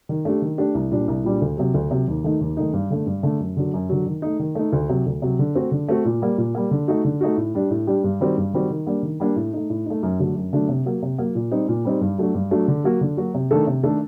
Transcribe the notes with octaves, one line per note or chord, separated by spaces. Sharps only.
D#3
A3 D4 G4
D#3
A3 D4 G4
C2
A#2 G3 D4
C2
A#2 G3 D4
D2
C3 F#3
D2
C3 F#3
D#2
D#3 A3 D#4
D#2
D#3 A3 D#4
G2
D3 A3
G2
D3 A3
F#2
D3 F#3
F#2
D3 F#3
D#3
A3 D#4
D#3
A3 D#4
D2
C3 F#3
D2
C3 F#3
D3
A3 C4 F#4
D3
A3 C4 F#4
A#2
G3 A#3
A#2
G3 A#3
D3
A3 D#4 F#4
D3
A3 D#4 F#4
A2
G3 D4 G4
A2
G3 D4 G4
G2
D#3 G3 C4 F#4
G2
D#3 G3 C4 F#4
D#3
G3 A#3 D4
D#3
G3 A#3 D4
A2
A3 D#4
A2
A3 D#4
F#2
D3 F#3 A3 D4
F#2
D3 F#3 A3 D4
C3
F#3 A#3
C3
F#3 A#3
A#2
G3 C4 D#4
A#2
G3 C4 D#4
G2
F#3 A3 D4 F#4
G2
F#3 A3 D4 F#4
D3
F#3 A#3 F#4
D3
F#3 A#3 F#4
C3
D#3 A3 D4 A4
C3
D#3 A3 D4 A4